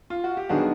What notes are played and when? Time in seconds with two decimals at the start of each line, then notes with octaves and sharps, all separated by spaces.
0.10 F4
0.24 F#4
0.37 G4
0.49 D#3 F#3 B3 D4 F#4 G#4